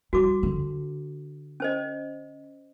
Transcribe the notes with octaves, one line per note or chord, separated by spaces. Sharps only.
G3 F#4 D6
D3
C#4 C5 D#5